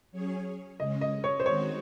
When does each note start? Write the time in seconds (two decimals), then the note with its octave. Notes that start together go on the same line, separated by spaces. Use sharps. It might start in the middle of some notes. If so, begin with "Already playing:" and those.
0.12 F#3 C#4 G#4 C#5
0.79 C#3 G#3 C#4 D#5
1.01 D#5
1.24 C#5
1.40 C5
1.46 D#3 G#3 C4 D#4 F#4 C#5